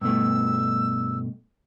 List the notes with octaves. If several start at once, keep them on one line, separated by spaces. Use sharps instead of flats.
G2 B2 A3 E6